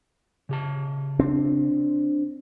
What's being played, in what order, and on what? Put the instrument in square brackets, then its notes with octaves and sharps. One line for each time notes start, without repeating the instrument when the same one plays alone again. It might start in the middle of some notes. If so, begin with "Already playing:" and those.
[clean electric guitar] C#3 G4 A5
[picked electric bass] C4 D4